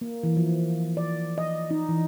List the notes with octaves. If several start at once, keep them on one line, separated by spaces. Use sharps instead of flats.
A#3
E3
F3
D5
D#5
D#4
E3